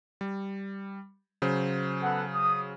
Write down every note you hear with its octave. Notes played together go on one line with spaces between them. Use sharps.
G3
C#3 F#3 C5
B3 A4 F#5
D#6